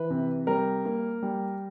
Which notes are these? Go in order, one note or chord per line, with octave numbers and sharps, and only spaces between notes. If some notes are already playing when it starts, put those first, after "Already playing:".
Already playing: E3 B4
C3
G3 A#4
A#3
G3